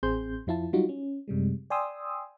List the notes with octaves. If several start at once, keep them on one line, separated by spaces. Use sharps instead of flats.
A1 C4 G#4 C6 G6
F2 F3 E4 F4 A5
F#3 G3 D#4 F4 F#4
C#4
F#2 C3 G3 G#3
D5 G5 G#5 C6 D#6 E6